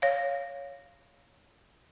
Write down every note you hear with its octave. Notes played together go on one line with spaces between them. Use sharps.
C#5 F5